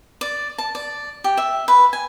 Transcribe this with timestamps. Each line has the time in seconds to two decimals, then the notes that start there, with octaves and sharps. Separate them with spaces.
0.21 D5
0.58 A5
0.75 D5
1.24 G4
1.37 E5
1.68 B4
1.93 G#5